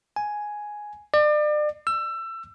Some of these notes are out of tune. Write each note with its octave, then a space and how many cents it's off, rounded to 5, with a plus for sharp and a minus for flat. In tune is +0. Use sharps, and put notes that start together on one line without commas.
G#5 +5
D5 +35
E6 +25